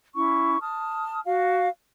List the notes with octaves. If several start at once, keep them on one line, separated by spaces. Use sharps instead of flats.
C#4 E4 C#6
A5 D#6 F6
F#4 F5